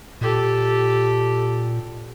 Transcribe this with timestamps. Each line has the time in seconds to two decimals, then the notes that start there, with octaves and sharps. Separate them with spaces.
0.21 A#2 G4 A4